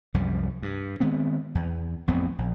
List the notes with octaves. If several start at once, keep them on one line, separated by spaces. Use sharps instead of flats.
C2 F#2 F3 G3
G2
D#3 G#3 B3 C4
E2
A1 F2 B3 C4
A#1